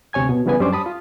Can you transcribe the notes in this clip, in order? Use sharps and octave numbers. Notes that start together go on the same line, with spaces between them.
D2 C3 C#5 G#5 G#6
B2
C#3 E3 G3 B3 B4 G#5
F#2 G3 C#4 D4 C5 D6
A5 B5 D#6
F4